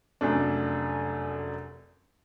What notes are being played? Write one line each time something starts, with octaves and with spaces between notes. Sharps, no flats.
F1 F#2 A3 D4